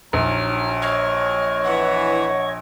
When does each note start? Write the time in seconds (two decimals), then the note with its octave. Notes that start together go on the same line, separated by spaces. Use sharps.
0.13 A#1 F#3 D#4 F6
0.82 C#5 D#5 C#6 F6
1.64 E3 F#5